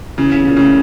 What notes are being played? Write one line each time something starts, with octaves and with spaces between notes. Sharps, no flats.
C#3 E3 C#4
A#2 C#4
A2 C#3